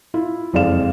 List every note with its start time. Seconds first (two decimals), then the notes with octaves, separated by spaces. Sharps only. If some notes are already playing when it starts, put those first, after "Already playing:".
0.14 E4 F4
0.53 F#1 F2 G#3 D5 F5 E7